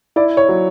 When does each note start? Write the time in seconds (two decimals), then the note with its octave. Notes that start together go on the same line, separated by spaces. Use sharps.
0.16 E4 D5
0.37 C#5
0.49 F#3